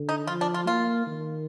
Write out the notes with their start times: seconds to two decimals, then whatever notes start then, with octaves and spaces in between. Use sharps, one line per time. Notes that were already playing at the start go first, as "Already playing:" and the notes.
Already playing: D3
0.09 D#4
0.27 F3 F4
0.41 D4
0.54 F4
0.67 A#3 F4
1.06 D#3